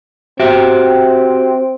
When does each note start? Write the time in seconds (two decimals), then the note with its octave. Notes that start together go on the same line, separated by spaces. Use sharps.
0.40 C4 F#4 G4 E5